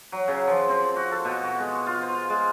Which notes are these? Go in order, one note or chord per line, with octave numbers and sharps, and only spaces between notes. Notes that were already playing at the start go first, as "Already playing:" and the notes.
F#3
C#3
F3
C4
F#4
A4
B2
F#4
G#3
F4
C5
G#3